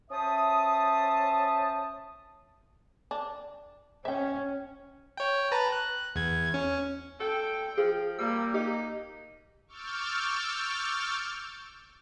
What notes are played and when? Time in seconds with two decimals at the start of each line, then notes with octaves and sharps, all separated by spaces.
0.10 C#4 C5 E5 A5 D#6
3.11 D4
4.05 C#4 E5 G5
5.17 C#5 G5
5.52 B4 A5 A#5
5.72 F#6
6.16 E2 G#6
6.54 C#4
7.20 A4 G5
7.77 F3 G#4
8.19 G3 A#3 E6
8.54 D#4 G4
9.67 C#6 D6 E6 F6 G6 A6